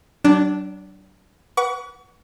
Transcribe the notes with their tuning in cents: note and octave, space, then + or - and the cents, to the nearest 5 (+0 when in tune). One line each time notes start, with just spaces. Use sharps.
F#3 +40 D4 +0
B4 -15 F#5 +10 C#6 +40